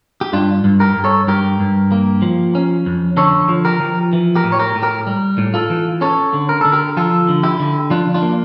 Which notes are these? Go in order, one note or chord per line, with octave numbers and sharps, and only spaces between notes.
G4
G2 D4 F4
G2
G4 A#4
G2
A4 C#5
G2 G4 A#4
G2
A#3
F3
C#4
F2
D3 A4 C#5
F3
G4 A#4
F3
E3
G4 A#4
A2
C#5
G4 A#4
A2
G4 A#4
G3
A2
F4 A4
E3
C#4 A4 C#5
D3
A#4
D3 A4
G4 A#4
F3 F4 A4
D3
E4 G4
D3
F3 D4 F4
D4 F4
A#3